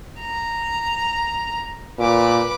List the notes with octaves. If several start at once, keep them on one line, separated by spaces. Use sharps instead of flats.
A#5
A#2 B4 D6